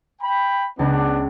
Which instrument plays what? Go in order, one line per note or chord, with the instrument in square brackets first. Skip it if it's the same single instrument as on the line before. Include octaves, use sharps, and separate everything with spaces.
[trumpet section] G5 B5
[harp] C#2 A#6 [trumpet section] B3 D4